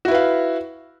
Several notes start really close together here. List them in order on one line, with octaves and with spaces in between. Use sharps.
F#4 E4 B4 F5